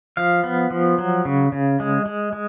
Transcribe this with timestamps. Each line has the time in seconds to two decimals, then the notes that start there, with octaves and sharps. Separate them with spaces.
0.17 F3 F5
0.44 B3
0.71 F3
0.98 F#3
1.25 C#3
1.52 C#3
1.80 G#3
2.06 G#3
2.33 G#3